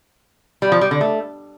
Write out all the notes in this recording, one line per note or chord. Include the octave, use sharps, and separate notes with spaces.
G3
F3
G3
D3
A3